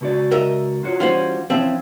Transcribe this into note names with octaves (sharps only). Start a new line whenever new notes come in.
C#2 F#4 D5
A#4 D#5 E5
F4 F#4 C#5
E3 G3 C#4 F4 F#4 C5
E3 F3 C4 C#4 E5